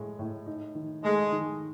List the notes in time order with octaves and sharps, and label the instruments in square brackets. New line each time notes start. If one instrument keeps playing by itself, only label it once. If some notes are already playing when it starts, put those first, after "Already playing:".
Already playing: [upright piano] A2 G#3
A2
D#4
D#3
[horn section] G#3 [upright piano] A3
[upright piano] D#3